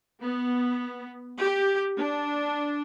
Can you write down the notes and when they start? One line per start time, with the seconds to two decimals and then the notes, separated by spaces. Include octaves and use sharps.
0.20 B3
1.38 G4
1.97 D4